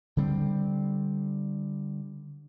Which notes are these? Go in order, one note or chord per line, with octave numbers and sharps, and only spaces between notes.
D3 G3 C4